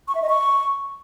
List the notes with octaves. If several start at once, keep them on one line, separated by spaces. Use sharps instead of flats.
C#6
E5
D#5
C#6